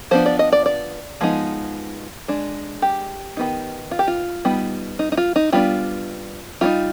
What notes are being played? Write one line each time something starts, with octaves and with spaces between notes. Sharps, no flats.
F3 B3 D4 C5
D5
D#5
D5
D5
F3 G#3 B3 D#4
G#3 D4
G4
D#3 B3 D#4
F4
G4
F4
G3 B3 D#4
D#4
D#4
F4
D#4
G3 B3 D4 F4
G3 C4 D#4 F4